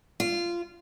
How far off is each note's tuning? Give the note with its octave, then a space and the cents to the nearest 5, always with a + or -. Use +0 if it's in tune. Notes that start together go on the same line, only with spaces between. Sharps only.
F4 -15